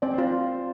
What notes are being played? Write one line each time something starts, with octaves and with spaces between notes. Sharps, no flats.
C4 D5
C5
F4